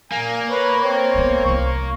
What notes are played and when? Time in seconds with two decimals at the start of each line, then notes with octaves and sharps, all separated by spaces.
0.12 A#2 A#3 G#5
0.50 B4 C#5
0.81 C4 C#5
1.14 G#3 B3
1.46 C2 E4 C#6